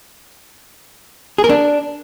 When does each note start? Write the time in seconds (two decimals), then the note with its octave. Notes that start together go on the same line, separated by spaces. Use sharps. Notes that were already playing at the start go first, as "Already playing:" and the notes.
1.38 G#4
1.44 A#4
1.49 D4